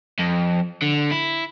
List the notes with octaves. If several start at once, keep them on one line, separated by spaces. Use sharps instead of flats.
F2
D3
E4